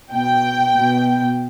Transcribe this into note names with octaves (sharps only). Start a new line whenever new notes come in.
B2 G5
B2